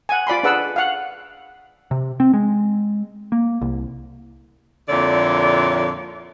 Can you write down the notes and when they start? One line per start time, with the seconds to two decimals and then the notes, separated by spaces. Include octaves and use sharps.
0.09 F#5 G#5
0.27 F4 D5 B5 C6
0.43 D4 G#4 B4 F#5 A5 E6
0.76 F5 F#5
1.91 C3
2.20 C4
2.34 G#3
3.32 A#3
3.62 C2
4.89 F2 A#2 D3 E4 C#5 D5